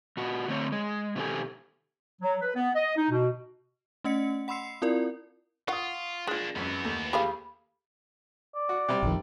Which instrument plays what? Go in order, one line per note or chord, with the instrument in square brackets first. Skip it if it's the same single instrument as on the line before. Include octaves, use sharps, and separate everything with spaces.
[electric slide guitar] A#2 F#4
D3 A3 C4 C#5
G#3
B2 D#3 C4 G4 A4 G#5
[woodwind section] F#3
B4
B3
D#5
D#4
B2
[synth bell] A3 C#4 D#5 F#5 C#7
F#5 B5 C6 E6 C7 C#7
C4 E4 F4 A#4 D5
[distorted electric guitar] F4 [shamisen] F5 F#5 [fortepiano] C#6 D#6
[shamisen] G#3 F4 [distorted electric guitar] A#3 D4
[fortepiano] G#1 F#2 [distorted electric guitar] E3 B3
[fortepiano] D#2 A3
[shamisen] G4 G#4 F5 [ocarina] B5
[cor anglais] D5
[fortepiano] F#4
C3 G3
[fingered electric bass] A#1 F2 D#3